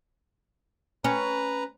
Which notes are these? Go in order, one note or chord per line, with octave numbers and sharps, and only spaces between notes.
C#4 B4 A#5